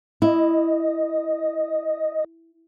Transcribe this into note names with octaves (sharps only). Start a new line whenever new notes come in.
E4 D#5